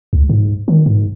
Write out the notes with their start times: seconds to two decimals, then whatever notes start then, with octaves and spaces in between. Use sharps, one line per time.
0.13 C#2
0.29 G#2
0.68 D#3
0.86 G#2